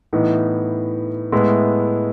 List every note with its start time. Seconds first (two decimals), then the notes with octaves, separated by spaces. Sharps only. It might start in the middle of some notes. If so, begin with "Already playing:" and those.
0.13 A2 E3 B3 D#4
1.32 A2 G#3 B3 E4